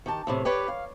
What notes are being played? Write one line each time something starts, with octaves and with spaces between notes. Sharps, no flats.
D#3 G4 A5
E2 A2 C3
G4 B4 C#5 D5
F5